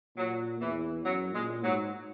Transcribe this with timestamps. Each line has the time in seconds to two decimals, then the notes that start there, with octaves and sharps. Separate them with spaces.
0.16 A#2 F#3
0.61 E2 E3
1.05 F#2 F#3
1.34 A#2 G#3
1.63 G#2 F#3